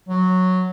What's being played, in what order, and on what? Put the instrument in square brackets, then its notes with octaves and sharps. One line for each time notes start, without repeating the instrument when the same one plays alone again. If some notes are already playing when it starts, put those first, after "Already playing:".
[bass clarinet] F#3